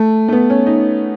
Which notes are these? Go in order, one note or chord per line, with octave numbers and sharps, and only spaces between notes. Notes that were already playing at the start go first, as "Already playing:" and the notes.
Already playing: A3
A3
B3
C#4
D#4